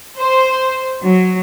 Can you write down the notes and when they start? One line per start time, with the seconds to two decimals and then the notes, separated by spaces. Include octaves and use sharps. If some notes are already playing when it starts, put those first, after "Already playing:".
0.18 C5
1.04 F#3